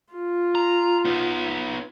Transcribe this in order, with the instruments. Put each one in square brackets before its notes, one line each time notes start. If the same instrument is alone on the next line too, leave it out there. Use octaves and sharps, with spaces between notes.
[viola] F4
[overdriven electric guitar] A#5
B3 D#4